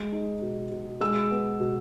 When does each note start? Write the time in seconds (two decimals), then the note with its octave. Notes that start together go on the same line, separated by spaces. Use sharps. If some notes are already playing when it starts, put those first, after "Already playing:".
Already playing: G#3
0.12 D#4
0.42 B2
0.71 B2
1.01 G#3 E6
1.31 B3
1.60 B2